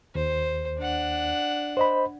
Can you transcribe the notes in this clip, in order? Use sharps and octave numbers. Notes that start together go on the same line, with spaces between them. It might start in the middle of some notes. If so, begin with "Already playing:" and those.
D#2 C5
D4 F#5
C5 D#5 B5